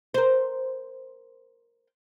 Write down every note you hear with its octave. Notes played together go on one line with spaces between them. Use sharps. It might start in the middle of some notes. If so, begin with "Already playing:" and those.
A#4 C5